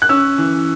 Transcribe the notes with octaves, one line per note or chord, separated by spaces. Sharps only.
F#6
C#4 E6
E3